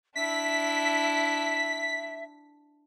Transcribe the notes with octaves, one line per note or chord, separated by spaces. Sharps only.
D4 E4 E5 B6